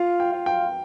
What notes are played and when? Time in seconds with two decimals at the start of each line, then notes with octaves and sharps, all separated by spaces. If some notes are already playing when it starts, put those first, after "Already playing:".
Already playing: F4 F5
0.20 G5
0.32 F4
0.46 G5